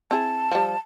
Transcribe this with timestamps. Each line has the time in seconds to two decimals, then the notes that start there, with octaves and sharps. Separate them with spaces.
0.11 C4 E4 G#4 A5
0.51 F3 G3